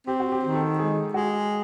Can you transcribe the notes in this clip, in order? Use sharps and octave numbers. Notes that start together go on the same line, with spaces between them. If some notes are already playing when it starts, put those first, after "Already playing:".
C4 G4
F#4
G4
D#3
A4
G#3 G#4
G#3 F#4